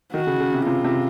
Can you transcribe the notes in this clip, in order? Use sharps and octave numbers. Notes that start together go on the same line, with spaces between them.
D#3 F#4
C#3
C#3
C3
C3 F4
C3